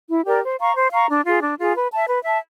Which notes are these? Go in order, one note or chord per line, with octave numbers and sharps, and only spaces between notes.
E4
G4 A#4 D5
C5
F5 A#5 C#6
C5
F5 A#5 C#6
D4
F4 G#4
D4
F4 G#4
B4
E5 A5
B4
E5 A5